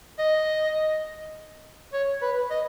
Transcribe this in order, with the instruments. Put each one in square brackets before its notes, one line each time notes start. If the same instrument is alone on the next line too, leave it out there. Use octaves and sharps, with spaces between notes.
[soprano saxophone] D#5
C#5
B4
D#5